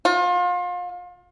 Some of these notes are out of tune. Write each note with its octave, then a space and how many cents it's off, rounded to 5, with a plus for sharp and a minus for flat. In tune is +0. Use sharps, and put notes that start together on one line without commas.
F4 +35